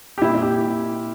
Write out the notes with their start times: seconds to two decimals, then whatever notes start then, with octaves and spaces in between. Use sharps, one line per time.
0.18 G4
0.22 A#2 E4
0.35 E4
0.42 G4